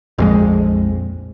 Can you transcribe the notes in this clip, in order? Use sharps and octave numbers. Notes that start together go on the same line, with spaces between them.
A#1 F2 G#3